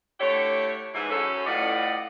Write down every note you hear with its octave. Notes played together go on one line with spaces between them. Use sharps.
D3 A3 E4 G4 C#5
G#2 E3
F#2 C#4 A4
A2 F4 B4 D5 D#5 F#5